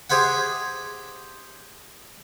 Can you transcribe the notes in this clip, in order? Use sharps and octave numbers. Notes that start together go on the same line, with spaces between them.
G4 G#4 C5 E5 F#5